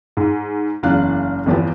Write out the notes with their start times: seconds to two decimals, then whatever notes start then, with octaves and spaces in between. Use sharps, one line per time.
0.17 G#2
0.83 F#1 E2 C#3 D4 F5 F#6
1.46 G1 E2 F3 B3 G4